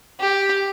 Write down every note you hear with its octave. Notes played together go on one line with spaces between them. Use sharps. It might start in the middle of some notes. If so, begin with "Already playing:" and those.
G4